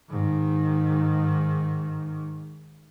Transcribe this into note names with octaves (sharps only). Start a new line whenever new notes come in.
G#2 D#3